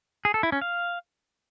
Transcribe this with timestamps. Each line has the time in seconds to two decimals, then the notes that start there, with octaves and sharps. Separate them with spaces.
0.25 G#4
0.34 A4
0.43 E4
0.52 C#4
0.61 F5